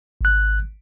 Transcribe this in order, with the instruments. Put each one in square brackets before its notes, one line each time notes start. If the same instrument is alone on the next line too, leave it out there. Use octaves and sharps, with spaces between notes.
[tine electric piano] G#1 F#6